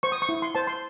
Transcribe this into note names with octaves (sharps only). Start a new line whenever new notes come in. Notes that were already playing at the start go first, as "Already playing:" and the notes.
C5 C#6
D#6
C#6
E4
C6
C5 A5
C6